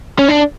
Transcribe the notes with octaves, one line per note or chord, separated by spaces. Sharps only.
C#4
D4